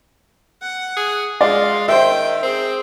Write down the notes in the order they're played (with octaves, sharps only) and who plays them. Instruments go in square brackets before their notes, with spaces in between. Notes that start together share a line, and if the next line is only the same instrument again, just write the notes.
[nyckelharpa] F#5
[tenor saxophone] G#4
[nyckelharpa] G#3 [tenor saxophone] F4 [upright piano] D5
[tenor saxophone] D#3 [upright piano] C5 E5 [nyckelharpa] G5
[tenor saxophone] C4 [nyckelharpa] G#4